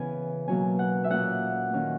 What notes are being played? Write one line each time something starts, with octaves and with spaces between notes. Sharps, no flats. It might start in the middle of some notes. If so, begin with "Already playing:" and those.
Already playing: C#3 E3 B3 G#5
B2 F#3 A#3 C#4 G#5
F#5
E5
A#2 A#3 C#4 F#5
D#3 A#3 C#4